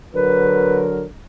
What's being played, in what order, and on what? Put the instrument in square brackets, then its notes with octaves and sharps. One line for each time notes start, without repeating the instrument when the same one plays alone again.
[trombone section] D3 F#3 A#4 [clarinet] B4